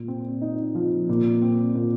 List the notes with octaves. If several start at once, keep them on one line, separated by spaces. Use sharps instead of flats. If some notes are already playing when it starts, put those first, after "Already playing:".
Already playing: A#2
C4
D#4
F3
A#2
C4
A#2